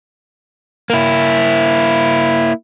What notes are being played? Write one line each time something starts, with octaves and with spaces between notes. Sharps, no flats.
A#3 E4